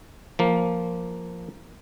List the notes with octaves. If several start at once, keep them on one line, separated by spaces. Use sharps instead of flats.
F3 A#3